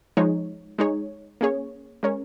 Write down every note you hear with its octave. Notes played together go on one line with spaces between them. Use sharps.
F3 G#3 D#4 C#5
G#3 D#4 G#4 C#5
A#3 C#4 G#4 C#5
G#3 C#4 A#4 C#5